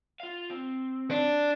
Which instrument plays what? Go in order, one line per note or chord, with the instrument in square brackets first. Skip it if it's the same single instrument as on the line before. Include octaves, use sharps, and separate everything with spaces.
[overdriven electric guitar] F4 F5
C4
[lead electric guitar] D4